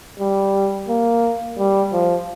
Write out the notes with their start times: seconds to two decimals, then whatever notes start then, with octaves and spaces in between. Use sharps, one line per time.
0.19 G3
0.89 A#3
1.58 G3
1.93 F3